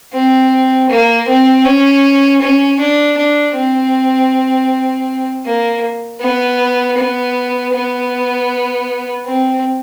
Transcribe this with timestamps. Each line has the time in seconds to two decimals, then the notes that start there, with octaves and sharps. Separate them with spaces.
0.14 C4
0.89 A#3
1.28 C4
1.65 C#4
2.41 C#4
2.80 D4
3.17 D4
3.56 C4
5.46 A#3
6.21 B3
6.98 B3
7.73 B3
9.26 C4